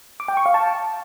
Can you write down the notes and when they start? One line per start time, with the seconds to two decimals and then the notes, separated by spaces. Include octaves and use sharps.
0.20 D6
0.28 G5
0.37 C#6
0.46 F5
0.54 A5